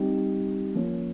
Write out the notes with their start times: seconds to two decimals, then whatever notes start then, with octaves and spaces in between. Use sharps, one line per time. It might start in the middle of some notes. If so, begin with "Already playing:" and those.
Already playing: G3 C4 D#4 G4
0.75 F3 A#3 C#4